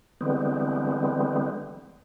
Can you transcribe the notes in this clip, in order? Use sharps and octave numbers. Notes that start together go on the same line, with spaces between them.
D3 E3 G3 G#3 B3 C4